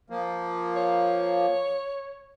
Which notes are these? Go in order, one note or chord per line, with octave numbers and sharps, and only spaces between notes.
F3 A#3
C#5